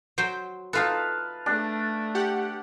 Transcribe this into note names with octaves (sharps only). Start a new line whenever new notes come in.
F#3 C5 G5
D#4 F4 A4 B4 F5 A5
A3 D4
G4 F#5